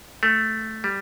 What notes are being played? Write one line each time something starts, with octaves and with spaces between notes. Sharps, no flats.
A3
G3